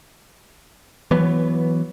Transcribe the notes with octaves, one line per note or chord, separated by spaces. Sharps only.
E3 F#3 B3